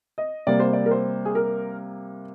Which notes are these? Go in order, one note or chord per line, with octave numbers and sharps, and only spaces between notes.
D#5
C3 G3 A#3 D5
C5
D5
A#4
C5
G#4
A#4